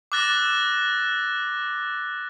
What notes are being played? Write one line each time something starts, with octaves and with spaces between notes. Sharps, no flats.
D6 E6 F#6 A6 A#6